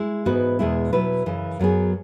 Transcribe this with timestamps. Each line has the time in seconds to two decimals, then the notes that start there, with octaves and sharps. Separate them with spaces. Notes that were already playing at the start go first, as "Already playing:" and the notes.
Already playing: G#3 E4
0.25 G#2 E3 B3 F#4 B4
0.59 E2 B2 G#3 E4
0.93 B2 F#3 E4 B4
1.26 F#2 C#3 E3
1.59 F#2 F#3 B3 G#4